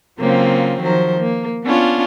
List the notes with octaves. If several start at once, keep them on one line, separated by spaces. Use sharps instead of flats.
C#3 F#3 A#3 C4 F4
D#3 F3 F#3 C5
A#3
B3 C#4 D4 F4